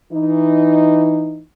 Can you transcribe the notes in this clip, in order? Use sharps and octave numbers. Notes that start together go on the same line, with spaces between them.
E3 D#4